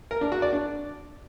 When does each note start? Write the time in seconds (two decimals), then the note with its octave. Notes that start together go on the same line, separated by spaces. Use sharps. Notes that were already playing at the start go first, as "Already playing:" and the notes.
0.11 A#4
0.21 D4
0.32 F#4
0.42 D5
0.53 D4